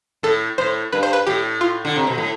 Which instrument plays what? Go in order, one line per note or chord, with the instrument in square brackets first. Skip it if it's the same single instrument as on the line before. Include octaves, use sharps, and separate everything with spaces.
[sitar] A2 [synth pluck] A4
[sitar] A2 [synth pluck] C5
[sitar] G2 [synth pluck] B4
[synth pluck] C5
B4
[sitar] A2 [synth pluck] G4
[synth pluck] F4
[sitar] D3
C3
B2
A2